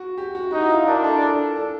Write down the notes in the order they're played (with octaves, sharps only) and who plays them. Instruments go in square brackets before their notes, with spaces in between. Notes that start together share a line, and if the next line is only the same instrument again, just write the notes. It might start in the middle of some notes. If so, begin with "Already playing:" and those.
Already playing: [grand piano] F#4
G4
F#4
[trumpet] D#4 [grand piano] F#4
[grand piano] E4
F4
[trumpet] D4 [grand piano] A#4
[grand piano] A4
A4
A4